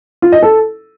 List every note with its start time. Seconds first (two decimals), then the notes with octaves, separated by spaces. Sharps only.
0.22 F4
0.32 D#5
0.42 A4